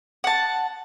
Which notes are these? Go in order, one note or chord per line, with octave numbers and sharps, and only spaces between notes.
F#5 A5